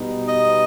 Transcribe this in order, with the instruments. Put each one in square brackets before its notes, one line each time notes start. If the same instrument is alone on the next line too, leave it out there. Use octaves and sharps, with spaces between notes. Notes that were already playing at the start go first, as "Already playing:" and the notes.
Already playing: [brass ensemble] B2 G3 B3 D#4
[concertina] D#5